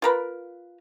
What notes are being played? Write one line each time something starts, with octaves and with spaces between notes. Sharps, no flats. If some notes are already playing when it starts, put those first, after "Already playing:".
F4 A#4 B4